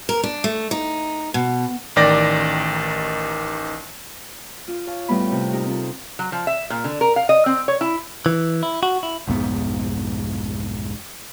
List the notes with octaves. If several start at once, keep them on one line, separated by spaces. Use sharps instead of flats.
A#4
D4
A3
D#4
B2
A1 D#3 D5 G5 A#6
F4
C#5 F5 A5
A2 G3 B3 B5
C3
D#4 G4 A#4
C4 F4 A4
F#3
F3
E5
A#2
D3
A#4
F5
D#5
C4
C#5
E4
E3
E4
F#4
E4
B1 F2 G#2 B3